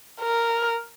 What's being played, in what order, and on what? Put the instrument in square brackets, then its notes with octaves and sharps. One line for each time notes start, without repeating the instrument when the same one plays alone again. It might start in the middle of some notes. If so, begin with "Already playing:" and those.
[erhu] A#4